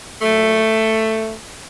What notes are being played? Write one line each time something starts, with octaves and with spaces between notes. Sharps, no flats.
A#2 F#3 A3